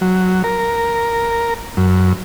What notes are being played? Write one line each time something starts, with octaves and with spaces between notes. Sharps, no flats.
F#3
A#4
F#2